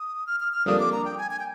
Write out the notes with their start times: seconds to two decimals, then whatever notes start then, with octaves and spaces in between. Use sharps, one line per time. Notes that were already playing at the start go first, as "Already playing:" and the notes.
Already playing: D#6
0.27 F6
0.40 F6
0.53 F6
0.66 F2 D3 G3 A#3 D4 D#6
0.79 D6
0.92 A#5
1.05 G5
1.18 G#5
1.31 G#5
1.39 G5